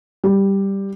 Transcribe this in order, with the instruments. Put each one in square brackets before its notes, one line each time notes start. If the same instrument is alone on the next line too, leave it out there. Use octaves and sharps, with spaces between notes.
[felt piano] G3